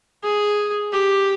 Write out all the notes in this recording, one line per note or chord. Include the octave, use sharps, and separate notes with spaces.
G#4
G4